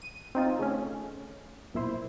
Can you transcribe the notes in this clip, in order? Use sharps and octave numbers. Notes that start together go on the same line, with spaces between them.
D#7
C4 D#4 F4
C#3 A3 C#4
B1 A#2 E4 C5